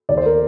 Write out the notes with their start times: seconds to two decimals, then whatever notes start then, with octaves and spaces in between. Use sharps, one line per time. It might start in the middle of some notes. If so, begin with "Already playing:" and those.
0.09 D#2 D5
0.17 C5
0.26 A#4